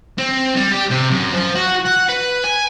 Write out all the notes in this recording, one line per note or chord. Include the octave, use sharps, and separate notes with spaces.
C4
G3
G4
C3
F#2
F3
F#4
F#5
B4
G#5